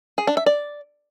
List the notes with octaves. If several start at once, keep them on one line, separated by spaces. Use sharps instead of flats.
G#4
D4
E5
D5